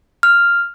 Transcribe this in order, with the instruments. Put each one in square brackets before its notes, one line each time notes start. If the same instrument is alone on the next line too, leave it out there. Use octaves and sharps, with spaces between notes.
[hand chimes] F6